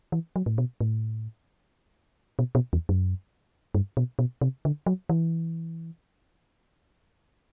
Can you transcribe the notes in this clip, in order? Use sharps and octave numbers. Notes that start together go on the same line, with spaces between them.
E3
F#3
A2
B2
A2
B2
B2
E2
F#2
G2
B2
B2
C3
D3
F#3
E3